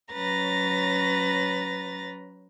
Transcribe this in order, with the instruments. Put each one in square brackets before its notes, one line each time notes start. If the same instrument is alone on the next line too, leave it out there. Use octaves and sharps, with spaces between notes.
[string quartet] F#3 C#4 B4 A#5 A6 A#6